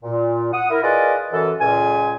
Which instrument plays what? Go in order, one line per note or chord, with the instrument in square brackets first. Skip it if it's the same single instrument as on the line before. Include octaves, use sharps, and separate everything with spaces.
[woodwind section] A#2
F#5 D#6
E4 A#4
F4 G#4 A#4 B4 D5 D#5
F#2 E3 A4
C#2 A#2 G#5